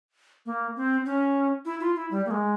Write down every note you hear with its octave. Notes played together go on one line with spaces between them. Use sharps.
A#3
C4
C#4
E4
F4
E4
G3
A#3
G#3